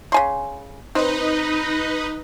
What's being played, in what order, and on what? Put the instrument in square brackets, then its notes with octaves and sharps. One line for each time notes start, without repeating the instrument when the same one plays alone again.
[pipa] C#3 G#5 C6
[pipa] C4 [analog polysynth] D#4 B4 D#5